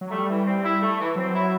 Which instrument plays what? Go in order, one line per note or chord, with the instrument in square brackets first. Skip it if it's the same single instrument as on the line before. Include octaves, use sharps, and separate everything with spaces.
[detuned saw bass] F#3
[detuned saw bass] G3 [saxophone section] A3
[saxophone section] E3
C4
E4
A3
E3
[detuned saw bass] F#3 [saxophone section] C4
[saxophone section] E4